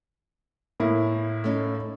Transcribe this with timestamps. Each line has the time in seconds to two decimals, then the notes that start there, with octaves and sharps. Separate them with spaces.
0.80 A2 A#3 E4
1.44 A3 C#4 D#4